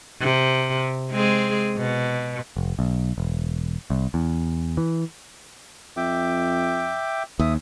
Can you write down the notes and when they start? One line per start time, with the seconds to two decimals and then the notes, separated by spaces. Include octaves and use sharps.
0.21 C3
1.11 G#3 C4 G#4
1.78 B2
2.57 F1
2.79 B1
3.18 E1
3.90 C2
4.14 E2
4.77 E3
5.97 F2 E5 G5 D6
7.39 D#2 E5 D#6